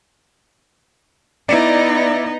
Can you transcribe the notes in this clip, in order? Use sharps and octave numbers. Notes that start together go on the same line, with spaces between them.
B3 D#4 E4 D5